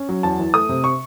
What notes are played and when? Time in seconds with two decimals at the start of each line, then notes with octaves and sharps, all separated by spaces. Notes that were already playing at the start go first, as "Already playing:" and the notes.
Already playing: C#4
0.09 F#3
0.23 E2 A5
0.39 E3
0.54 A3 D#6
0.69 C3
0.84 C#6